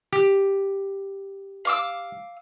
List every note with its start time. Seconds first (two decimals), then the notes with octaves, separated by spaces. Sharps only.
0.13 G4
1.65 F5 D6 E6